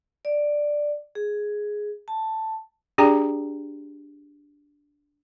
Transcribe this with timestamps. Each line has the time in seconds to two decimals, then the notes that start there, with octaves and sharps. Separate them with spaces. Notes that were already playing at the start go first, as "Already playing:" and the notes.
0.25 D5
1.15 G#4
2.08 A5
2.98 D4 G4 G#4 D5 G5 A#5